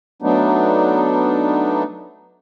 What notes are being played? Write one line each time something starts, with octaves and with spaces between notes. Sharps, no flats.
F#3 A3 B3 D4 D#4